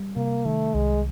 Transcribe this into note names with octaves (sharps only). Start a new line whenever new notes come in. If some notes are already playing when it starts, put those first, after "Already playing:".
Already playing: G3
C3 A#3
D#3 A3
C2 G#3